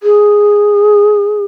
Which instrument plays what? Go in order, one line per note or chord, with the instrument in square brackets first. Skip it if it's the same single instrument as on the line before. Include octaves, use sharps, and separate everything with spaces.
[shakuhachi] G#4